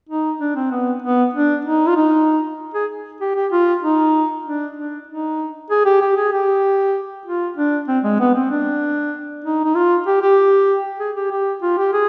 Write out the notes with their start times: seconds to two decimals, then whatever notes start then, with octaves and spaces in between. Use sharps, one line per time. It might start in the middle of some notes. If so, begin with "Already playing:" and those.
0.09 D#4
0.41 D4
0.56 C4
0.71 B3
1.03 B3
1.34 D4
1.65 D#4
1.88 F4
1.96 D#4
2.74 G#4
3.21 G4
3.36 G4
3.52 F4
3.83 D#4
4.45 D4
4.77 D4
5.07 D#4
5.70 G#4
5.85 G4
6.01 G4
6.17 G#4
6.33 G4
7.26 F4
7.57 D4
7.88 C4
8.04 G#3
8.20 B3
8.35 C4
8.50 D4
9.44 D#4
9.64 D#4
9.75 F4
10.07 G4
10.22 G4
11.00 G#4
11.16 G4
11.31 G4
11.62 F4
11.78 G4
11.93 G#4